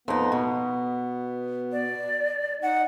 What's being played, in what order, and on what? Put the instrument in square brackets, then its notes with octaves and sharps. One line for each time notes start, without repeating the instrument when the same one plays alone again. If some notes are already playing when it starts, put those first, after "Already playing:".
[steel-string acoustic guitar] F2 D#4 [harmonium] B3
[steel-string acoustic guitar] B2
[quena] D5
[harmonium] D#4 [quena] F#5